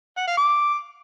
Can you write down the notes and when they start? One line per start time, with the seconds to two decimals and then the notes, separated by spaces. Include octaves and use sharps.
0.17 F#5
0.27 F5
0.37 D6